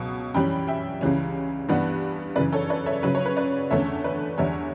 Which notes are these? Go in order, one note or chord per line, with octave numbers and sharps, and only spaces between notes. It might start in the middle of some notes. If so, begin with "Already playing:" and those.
Already playing: C#2 B2 F#3 B3
F#2 E3 G3 C#4 G5 B5
E5 G5
C#2 C#3 E3 G3 C#4
G2 E3 G3 B3 D4
F#2 C#3 E3 B4 D5
A4 C#5
B4 D5
C#5 E5
C#3 F#3 C#4 B4
C#5
B4
B4 D5
E2 D3 A3 C#4 C#5 E5
B4 D5
E2 D3 G3 D4 C#5 E5